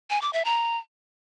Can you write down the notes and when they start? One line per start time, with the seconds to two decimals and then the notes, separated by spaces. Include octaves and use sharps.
0.10 G#5
0.22 D6
0.33 E5
0.45 A#5